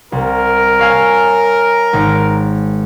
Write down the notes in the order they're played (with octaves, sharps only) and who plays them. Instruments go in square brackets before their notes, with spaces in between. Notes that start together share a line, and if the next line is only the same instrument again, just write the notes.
[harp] C2 [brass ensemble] A#4
[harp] C#5 F5 G#5
G#1